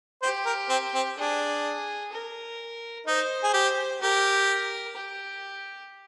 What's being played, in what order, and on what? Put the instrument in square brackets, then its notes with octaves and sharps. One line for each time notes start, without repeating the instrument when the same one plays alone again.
[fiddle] G4 [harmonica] C5
[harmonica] A#4
C4
C4
[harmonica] D4 [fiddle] G#4
[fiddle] A#4
[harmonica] D#4 [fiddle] C5
[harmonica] G#4
G4
[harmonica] G4 [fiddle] A#4
[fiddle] G4